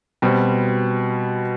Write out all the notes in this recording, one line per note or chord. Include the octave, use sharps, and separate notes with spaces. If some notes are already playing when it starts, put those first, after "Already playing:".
B2 G3 C4